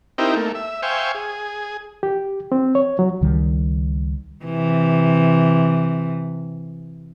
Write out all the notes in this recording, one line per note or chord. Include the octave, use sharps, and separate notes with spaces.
C4 D#4 E4 G4 A#4
A3 A#3
E5
C5 E5 F5 G5 G#5 C#6
G#4
G4
C4
C#5
F#3
C#2 D#3 G3
C3 E3